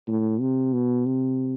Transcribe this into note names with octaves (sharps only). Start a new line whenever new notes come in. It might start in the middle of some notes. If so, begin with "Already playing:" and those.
A2
C3
B2
C3